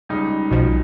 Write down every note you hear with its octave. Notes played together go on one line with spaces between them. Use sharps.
C#2 G3 D#4
B1 B2 F3